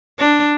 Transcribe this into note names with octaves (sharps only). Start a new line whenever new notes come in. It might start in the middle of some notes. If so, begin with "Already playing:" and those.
D4